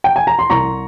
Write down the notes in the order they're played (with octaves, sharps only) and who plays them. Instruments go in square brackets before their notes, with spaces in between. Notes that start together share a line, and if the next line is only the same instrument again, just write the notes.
[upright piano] G5
G#5
A#5
C6
C2 A#5 C#6